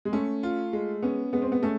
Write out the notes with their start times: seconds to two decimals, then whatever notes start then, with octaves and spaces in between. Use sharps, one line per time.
0.05 G#3
0.13 A3 C#4
0.43 F4
0.73 G#3
1.02 B3 C#4
1.33 G#3 B3
1.42 C4
1.52 B3
1.63 A3 C#4